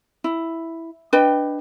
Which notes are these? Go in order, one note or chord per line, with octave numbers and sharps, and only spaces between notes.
E4
D4 B4 D#5 G5